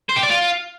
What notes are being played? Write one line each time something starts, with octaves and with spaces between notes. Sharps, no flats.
C5
G4
D5
F4